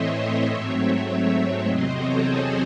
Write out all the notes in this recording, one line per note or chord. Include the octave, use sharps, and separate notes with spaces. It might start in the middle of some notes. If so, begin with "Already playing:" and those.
Already playing: A2 E3 A3 C4 C5 C#5 D#5 E5
C#5 E5
G#2 F#3 A3 C4
E2 C3 F#3 C4 C5 D#5
A4 C#5
G#4 C5